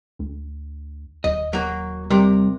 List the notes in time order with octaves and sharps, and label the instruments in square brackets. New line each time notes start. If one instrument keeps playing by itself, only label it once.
[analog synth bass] D2
[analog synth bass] D#1 [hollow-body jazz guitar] D#5
[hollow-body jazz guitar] F#3 A#3
[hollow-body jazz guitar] C3 A#4 [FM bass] G3